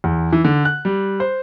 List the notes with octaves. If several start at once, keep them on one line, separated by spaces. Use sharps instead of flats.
E2
E3
D3
F#6
G3
C5